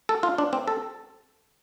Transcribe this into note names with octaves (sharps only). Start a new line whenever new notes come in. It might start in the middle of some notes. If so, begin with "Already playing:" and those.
A4
F4
D4
C4
A4